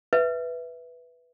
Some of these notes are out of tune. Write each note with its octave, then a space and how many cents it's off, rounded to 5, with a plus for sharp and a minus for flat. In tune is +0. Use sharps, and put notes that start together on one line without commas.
B4 +0 E5 +0